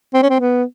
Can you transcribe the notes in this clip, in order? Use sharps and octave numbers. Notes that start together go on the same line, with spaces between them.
C4
C#4
C4
B3